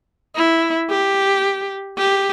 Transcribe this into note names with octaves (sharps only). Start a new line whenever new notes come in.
E4
G4
G4